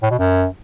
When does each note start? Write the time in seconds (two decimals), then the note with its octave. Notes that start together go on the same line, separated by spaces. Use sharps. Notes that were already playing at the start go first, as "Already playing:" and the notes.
0.03 A2
0.11 B2
0.19 F#2